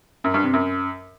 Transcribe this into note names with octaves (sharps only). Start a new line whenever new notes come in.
F#2
G2
C3
F#2